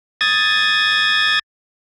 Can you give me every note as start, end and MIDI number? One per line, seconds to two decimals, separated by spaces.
0.21 1.39 87
0.21 1.39 92
0.21 1.39 93